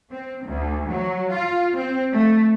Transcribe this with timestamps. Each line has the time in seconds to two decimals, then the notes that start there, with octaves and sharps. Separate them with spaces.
0.11 C4
0.45 D2
0.90 F#3
1.33 F4
1.77 C4
2.14 A3